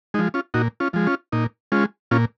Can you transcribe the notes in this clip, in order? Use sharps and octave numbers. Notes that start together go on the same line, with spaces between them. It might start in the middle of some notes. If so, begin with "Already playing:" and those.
F3 G#3 D#4
C#4 F4
A#2 D#4 F#4
C#4 F4
F3 G#3
C#4 F4
A#2 D#4
G#3 C#4 F4
A#2 C#4 F4